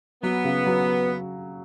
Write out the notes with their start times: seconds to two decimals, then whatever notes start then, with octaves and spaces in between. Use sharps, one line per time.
0.23 F#3 B3
0.45 C#3
0.66 F#3